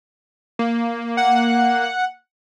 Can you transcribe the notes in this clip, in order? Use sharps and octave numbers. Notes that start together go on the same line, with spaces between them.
A#3
F#5